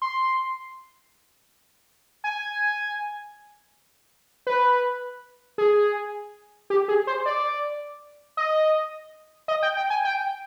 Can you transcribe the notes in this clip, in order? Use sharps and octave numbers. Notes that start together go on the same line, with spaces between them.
C6
G#5
B4
G#4
G4
G#4
C5
D5
D#5
D#5
G5
G5
G#5
G5